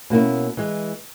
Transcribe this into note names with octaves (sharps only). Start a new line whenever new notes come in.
B2 A#3 C#4 E4
E3 G#3